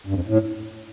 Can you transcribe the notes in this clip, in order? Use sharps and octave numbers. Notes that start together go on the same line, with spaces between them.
G2
F2
A2